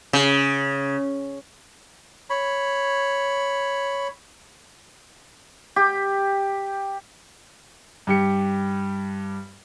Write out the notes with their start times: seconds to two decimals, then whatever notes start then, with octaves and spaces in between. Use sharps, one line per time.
0.13 C#3
2.30 C#5 B5
5.76 G4
8.07 G2 G4 C#7